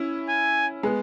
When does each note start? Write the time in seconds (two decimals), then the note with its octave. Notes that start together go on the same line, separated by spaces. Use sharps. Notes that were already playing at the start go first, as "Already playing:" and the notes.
Already playing: C#4 E4
0.29 G#5
0.83 G#3 B3